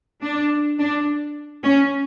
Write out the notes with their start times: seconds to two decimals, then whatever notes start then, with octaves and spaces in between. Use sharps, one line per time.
0.22 D4
0.79 D4
1.65 C#4